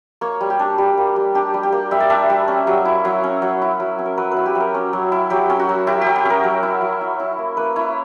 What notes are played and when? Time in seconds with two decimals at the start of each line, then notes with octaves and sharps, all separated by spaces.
0.21 A#3 C#5
0.41 G3
0.50 G4
0.59 D4
0.78 G3 G4
0.98 A#3
1.16 G3
1.35 D4 G4
1.54 G3
1.63 G4
1.72 A#3
1.91 G3 E5
2.00 D5
2.10 D4 E5
2.30 G3
2.48 C#4
2.67 F#3
2.85 E4
3.05 F#3 C#5
3.24 C#4
3.42 F#3
3.62 E4
3.80 F#3
3.99 C#4
4.06 A#4
4.17 F#3 B4
4.31 E4 B4
4.46 G4
4.55 F#3 A#4
4.74 C#4
4.93 F#3
5.12 E4
5.30 F#3 G4
5.50 C#4
5.60 F#4
5.69 F#3
5.87 E4 G4
6.01 F#3 G4
6.16 G4
6.25 C#4 A#4
6.44 F#3
6.63 E4
6.81 F#3
7.01 E4
7.20 E4
7.38 A#3
7.57 A#3 B4
7.76 E4 C#5